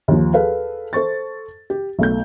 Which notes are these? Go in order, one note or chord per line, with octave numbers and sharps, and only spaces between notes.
D#2 F3
G#4 A4 B4 F5
A4 C5 C#6 A6
G4
B1 A3 G6